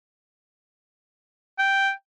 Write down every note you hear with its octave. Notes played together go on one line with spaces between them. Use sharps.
G5